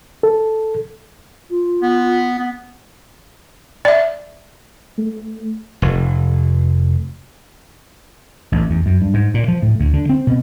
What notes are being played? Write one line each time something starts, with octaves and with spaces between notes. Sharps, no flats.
A4
F4
B3
B3
D5 E5
A3
F1
A1
E2
F#2
G2
G#2
A#2
F3
A2
D2
D3
C4
B2